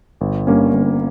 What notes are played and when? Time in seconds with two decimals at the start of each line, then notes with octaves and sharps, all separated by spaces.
0.21 G1
0.47 G2 G3 A#3 C#4
0.73 G1